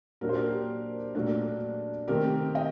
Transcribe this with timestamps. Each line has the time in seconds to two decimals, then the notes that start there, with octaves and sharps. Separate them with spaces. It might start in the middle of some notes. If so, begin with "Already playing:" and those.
0.21 A#2 F#3 A#3 D4 A#4
0.29 C5
0.35 G4 A#4
1.15 A#2 F#3 A3 D4
2.08 C3 D#3 A3 C4 G4 A#4
2.55 D#5 G5